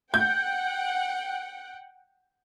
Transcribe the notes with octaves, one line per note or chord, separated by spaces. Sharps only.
F#5 G5 G6